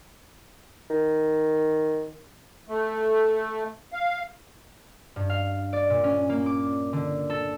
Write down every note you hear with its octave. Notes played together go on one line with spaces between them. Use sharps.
D#3
A3
F5
G2
F5
D5
A#2
C#4
A#3
D6
D3
A4